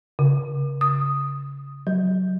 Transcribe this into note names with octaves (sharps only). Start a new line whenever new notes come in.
C#3
D#6
F#3